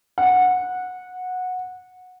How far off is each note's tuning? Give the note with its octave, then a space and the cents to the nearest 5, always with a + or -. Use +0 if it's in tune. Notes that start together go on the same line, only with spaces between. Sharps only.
F#5 -15